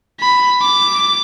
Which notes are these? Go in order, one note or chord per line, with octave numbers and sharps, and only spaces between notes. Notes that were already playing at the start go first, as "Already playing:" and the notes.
B5
D6